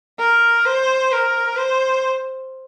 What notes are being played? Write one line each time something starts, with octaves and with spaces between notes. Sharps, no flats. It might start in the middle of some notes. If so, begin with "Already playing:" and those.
A#4
C5
A#4
C5